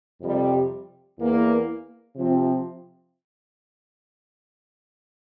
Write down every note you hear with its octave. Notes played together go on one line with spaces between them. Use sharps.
F2 C3 G3
E2 E3 A#3
C3 F3 C4